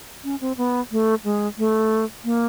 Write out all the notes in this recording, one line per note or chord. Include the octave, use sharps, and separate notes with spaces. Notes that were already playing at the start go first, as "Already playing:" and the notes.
C#4
C4
B3
A3
G#3
A3
A#3